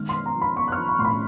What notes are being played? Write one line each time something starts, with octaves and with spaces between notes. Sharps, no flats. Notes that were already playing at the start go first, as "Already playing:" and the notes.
Already playing: D#3 G#3 F6
C6
B3
A#5
F3
B5
B3 C#6
F#6
F6
F3
B5
A2 C6
B5